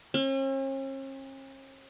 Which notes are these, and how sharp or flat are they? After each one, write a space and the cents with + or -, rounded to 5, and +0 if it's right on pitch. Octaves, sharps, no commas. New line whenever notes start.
C#4 -45